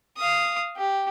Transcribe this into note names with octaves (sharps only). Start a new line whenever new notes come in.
F5 D#6
G4